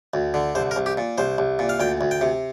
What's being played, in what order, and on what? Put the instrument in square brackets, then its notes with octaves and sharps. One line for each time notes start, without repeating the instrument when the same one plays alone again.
[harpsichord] D2
D3
C2 C5
A#4
C2
G4
A#2
C2 C5
C2
A#2
F5
D2 G5
D2
G5
C3